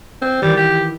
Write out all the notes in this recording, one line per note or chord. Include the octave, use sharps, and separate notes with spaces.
C4
D#3 E3 G3
G4